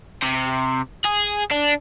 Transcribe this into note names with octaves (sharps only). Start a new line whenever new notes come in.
C3
G#4
D4